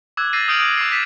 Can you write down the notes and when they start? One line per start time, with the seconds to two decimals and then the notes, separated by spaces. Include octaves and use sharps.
0.17 D6 E6 F#6 G#6
0.33 E6 G6 A6 A#6 C7 D#7
0.48 D#6 F6 G6 D7 F#7
0.59 A#6 D7
0.77 D6 D#6 C7
0.91 A6 B6 D#7 E7